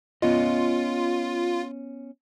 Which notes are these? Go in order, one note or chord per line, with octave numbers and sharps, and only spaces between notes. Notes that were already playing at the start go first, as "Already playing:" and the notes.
B3 C#4 F4 D#5